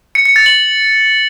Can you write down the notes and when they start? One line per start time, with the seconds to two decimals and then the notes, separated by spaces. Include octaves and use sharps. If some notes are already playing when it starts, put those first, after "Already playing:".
0.15 C#7
0.25 C#7
0.36 A6
0.46 F#7